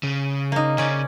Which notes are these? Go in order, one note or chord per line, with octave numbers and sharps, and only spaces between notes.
C#3
A#3 D#4
C#3 C#4 D5